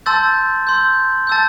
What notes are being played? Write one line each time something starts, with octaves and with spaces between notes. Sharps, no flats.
A5 C6 E6 G6 A6
C6 E6 G6
A5 E6 G6 A6